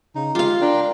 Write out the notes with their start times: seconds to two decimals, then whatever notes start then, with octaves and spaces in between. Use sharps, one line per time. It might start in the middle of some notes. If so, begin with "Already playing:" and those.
0.15 C#3 D#4
0.35 G#3 F4 G4 F5
0.61 D4 A#4 G5